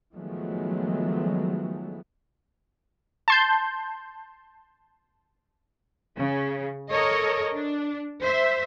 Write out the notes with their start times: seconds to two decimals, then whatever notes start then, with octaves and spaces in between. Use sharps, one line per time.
0.14 D#3 F3 F#3 G#3 A3 B3
3.28 A5 C6 G6
6.17 C#3
6.91 A4 A#4 C#5 D#5
7.54 D4
8.21 C5 E5